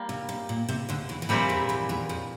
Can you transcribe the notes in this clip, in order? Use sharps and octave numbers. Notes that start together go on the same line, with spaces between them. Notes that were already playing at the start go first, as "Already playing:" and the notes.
Already playing: G3 A#3
C3
C3
A#2
C3
D2 D3
E2 E3
E3
F2 A#2 F3 G3 C4 E4 G4
E2 E3
E2 E3
E2 E3
F2 F3